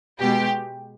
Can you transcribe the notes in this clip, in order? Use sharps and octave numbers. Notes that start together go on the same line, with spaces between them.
B2 G#3 G4